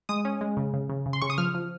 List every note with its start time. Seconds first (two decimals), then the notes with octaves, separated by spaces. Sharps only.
0.09 G#3 D#6
0.25 C#4
0.41 G#3
0.57 C#3
0.74 C#3
0.89 C#3
1.06 C#3
1.13 C6
1.22 C#3 C#6
1.30 D#6
1.38 F3 F6
1.54 F3